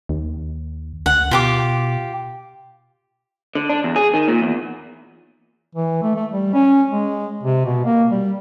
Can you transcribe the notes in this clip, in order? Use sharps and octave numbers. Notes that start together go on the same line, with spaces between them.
D#2
D2 F#5
B2 F4 G4 D6
D3
D4
E2
G#4
D#3
A#2
E2
E3
A3
A3
G3
C#4
G#3
C3
B2
A#3
G3